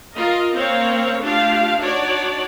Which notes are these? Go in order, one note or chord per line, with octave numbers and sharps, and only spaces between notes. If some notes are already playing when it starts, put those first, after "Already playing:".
F4 A#4 D#5
A#3 C4 A#4 C#5 F5
A3 D4 F4 G4 F5
D4 D#4 F#4 C#5 D5